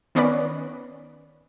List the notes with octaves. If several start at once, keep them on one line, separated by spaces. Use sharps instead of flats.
D#3 B3 C#4 B4 D5